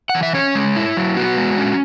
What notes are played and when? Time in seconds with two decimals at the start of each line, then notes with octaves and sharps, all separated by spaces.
0.09 F#5
0.15 E3
0.23 E5
0.34 C#4 C#5
0.55 G#3
0.76 E4
0.97 F#3
1.17 B3 F#4
1.37 G#3
1.58 C#4